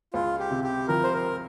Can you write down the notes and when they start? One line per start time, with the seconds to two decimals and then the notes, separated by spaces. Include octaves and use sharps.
0.13 C#2 F4
0.39 G4
0.51 C3
0.64 G4
0.88 F3 A#4
1.04 C5
1.13 A#4